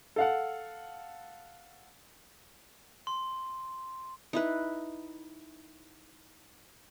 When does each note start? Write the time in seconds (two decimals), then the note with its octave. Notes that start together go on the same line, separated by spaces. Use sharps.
0.16 A4 F5 F#5
3.07 C6
4.33 D#4 E4 B4